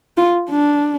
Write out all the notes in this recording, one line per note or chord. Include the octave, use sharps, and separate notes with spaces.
F4
D4